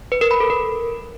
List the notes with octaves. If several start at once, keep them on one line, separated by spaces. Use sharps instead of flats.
B4
A#4
B5
A4
A#4